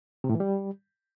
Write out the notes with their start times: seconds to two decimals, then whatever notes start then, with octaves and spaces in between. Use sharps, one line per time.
0.24 C3
0.29 A2
0.35 E3
0.40 G3